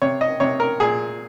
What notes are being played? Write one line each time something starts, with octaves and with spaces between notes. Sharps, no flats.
C3 C#5
D#5
C3 C#5
A#4
A#2 G#4